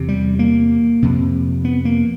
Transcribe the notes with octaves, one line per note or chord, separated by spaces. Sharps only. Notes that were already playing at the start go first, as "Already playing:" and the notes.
Already playing: E2 C3
G3
A#3
F2 C3
B3
A#3